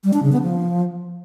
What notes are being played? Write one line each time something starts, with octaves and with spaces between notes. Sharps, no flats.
G3
D4
C#3
B3
F3